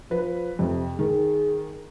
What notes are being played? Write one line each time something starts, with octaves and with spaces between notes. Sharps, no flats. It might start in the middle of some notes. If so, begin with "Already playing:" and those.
F3 B4
F2 C3
D#3 G#4